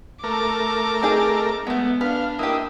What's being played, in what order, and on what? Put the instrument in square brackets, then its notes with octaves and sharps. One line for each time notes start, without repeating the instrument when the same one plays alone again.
[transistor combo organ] A3 A#4 [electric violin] D6
[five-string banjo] C4 D#4 G#4
[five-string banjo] G#3 A3 [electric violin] B3
[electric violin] D4 [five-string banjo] B4 [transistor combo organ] F5
[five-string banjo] A#3 G4 [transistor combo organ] E4 D#5